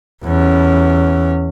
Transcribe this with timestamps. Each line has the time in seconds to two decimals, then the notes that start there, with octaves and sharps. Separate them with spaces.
0.24 E2 C#4